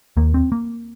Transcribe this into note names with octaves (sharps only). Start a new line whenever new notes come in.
D#2 A#3
C4
A#3